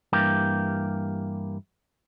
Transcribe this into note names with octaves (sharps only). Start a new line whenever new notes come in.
G2 E3 A#3 G4